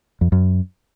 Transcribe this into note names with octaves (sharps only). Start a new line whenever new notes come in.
F2
F#2